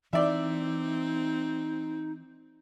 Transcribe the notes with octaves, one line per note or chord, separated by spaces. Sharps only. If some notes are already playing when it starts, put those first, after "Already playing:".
E3 C4 D#4 D5 E5